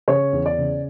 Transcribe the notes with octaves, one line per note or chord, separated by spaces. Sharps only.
C#3 C#5
E2
D5
C#3